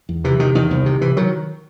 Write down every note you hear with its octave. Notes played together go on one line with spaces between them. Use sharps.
E2
C3 E3
C3 D#3
E2 D#3
C2
C3
C3 E3
D#3 F#3